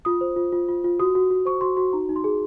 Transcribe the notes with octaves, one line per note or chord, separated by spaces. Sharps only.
F4 D#6
C5
F4
F4
F4
F4
F#4 D#6
F#4
F#4
C5 C#6
F#4 C6
F#4 C6
D#4 A#5
D#4
C6
G#4